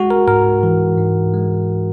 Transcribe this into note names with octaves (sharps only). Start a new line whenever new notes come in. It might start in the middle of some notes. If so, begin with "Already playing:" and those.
Already playing: G#3 F#4
A#4
G#2 A#4
E3
G#2
G#3